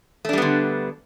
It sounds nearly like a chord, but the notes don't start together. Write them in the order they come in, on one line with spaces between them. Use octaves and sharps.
A3 D4 G3 B3 D3